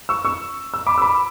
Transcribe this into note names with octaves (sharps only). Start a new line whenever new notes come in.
C#6 E6
C#6 E6
E6
B5 D6
E6
B5 D6